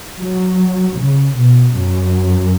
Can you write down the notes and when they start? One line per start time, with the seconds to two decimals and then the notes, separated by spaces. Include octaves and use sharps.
0.19 F#3
0.97 C#3
1.36 B2
1.76 F#2